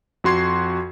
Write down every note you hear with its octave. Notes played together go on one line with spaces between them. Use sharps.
F2 F#4 C6 G#6 C7